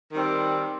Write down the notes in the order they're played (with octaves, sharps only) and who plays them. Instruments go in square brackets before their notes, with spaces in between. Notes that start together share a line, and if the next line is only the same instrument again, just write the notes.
[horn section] D#3 G3 C4